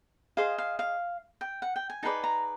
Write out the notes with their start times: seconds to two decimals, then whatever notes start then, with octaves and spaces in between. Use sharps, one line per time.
0.37 G#4 C5 D#5 F5
0.58 F5
0.79 F5
1.41 G5
1.62 F#5
1.76 G5
1.90 G#5
2.03 D#4 G#4 B4 D5 A5
2.24 A#5